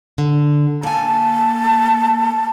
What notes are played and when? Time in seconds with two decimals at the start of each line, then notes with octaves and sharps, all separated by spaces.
0.18 D3
0.83 A#3 G#5 A5